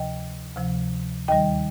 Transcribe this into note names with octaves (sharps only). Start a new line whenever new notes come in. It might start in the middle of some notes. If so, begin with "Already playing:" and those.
Already playing: D2 C3 F3 D#5 G5
D2 C3 F3
D#2 D#3 G3 D#5 G5